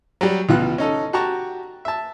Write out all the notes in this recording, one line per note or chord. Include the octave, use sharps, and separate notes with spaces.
F#3 G3 G4
C#2 B2 E3 F4 F#6
C#4 D#4 A4
F#4 G4 A5 A#5 C#6
E5 A5